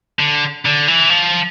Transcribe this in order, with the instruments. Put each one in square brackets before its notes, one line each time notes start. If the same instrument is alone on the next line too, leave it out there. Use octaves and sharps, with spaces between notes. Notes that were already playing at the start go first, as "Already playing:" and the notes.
[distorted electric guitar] D3
D3
E3
F3